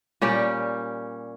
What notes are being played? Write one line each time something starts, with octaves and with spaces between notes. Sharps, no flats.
A#2 G3 C#4 G4